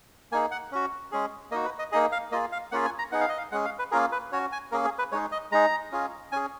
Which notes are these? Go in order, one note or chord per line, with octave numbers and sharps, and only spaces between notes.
A#3 D#4 G#4 G#5
F#5
C#4 F#4
G#3 C#4 G#4
A#3 D#4 F#4 D#5
B4
D#5
A#3 D#4 G#4 D#5
F5
A#3 F4 G#4 D#5
F5
A#3 C#4 F4 G#4 F#5
G#5
A#5
B3 D#4 G#4 F#5
F5
D#5
F5
G#3 C#4 G#4 F#5
F5
B4
A#3 C#4 F4 G#4 A#4
B4
C#4 F#4 C#5
G#5
A#3 C#4 G#4 A#4
G#4
B4
G#3 D#4 G#4 C#5
D#5
G#3 D#4 G#4 A#5
C#4 F4 G#4
C#4 G#4 G#5